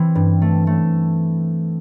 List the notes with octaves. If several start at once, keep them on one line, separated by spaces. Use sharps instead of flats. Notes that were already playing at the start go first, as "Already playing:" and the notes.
Already playing: E3 C4
G2
A3
A3